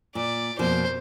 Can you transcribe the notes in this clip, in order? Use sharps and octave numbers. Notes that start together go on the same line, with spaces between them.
A#2 D5
F2 B2 A#3 C5